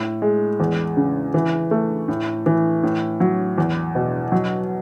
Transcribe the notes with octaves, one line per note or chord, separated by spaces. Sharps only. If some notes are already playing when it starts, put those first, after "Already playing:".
Already playing: A2
G#3
E2
C#3
E3
A3
A2
E3
A2
F#3
E2
B2
F#3